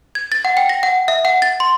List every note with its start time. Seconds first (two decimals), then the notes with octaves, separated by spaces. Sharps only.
0.15 G#6
0.32 A6
0.45 F#5
0.57 G5
0.69 A#6
0.83 F#5
1.08 E5
1.25 F#5
1.42 A6
1.60 C6